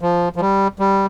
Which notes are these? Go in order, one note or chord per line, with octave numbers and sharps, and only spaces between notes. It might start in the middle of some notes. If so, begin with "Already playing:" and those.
F3
F3
G3
G3